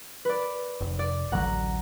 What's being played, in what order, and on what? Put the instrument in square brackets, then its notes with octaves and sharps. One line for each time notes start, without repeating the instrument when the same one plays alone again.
[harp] B4 D5
[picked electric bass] F1
[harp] D5
[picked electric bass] A1 D2 F#3 [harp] F#5 A#5